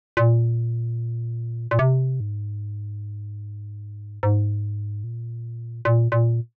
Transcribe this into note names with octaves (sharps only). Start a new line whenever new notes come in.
A#2
A#2
C3
G#2
G#2
A#2
A#2
A#2